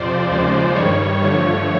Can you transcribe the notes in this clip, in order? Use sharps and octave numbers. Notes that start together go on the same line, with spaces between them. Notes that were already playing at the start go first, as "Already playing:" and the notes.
Already playing: F2 C3 F3 C5 D5
D#2 C#3 F3 G#3
G2 D#3 G3 C#5
G2 D3 F3 A3 C#5